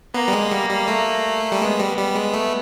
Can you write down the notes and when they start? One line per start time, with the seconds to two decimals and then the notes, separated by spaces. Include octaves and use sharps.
0.14 A#3 B3
0.28 G3
0.33 G#3
0.51 G3
0.70 G3
0.88 A3
1.52 G3
1.61 G#3 B3
1.80 G3
1.97 G3
2.15 G#3
2.34 A3